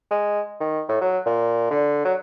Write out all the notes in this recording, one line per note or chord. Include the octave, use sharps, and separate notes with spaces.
G#3
D#3
A2
F#3
A#2
D3
F#3